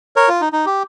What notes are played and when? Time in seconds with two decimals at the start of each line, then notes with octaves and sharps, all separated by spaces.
0.16 A#4 C#5
0.29 F4
0.41 D#4
0.53 D#4
0.66 G4